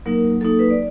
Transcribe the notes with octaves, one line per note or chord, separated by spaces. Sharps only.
F#3 A#3 D#4 A#4
F#3 A#3 D#4 A4
B4
D5